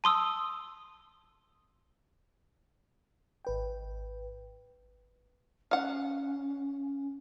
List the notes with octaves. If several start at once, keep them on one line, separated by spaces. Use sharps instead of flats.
A5 C6 D#6 E6
G#1 B4 G5
C#4 F5 F#5